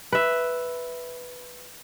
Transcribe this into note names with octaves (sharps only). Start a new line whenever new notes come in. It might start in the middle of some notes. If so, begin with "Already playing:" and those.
B4 E5